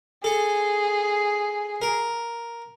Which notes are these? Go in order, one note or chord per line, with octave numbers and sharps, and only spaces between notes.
G#4 A4
A#4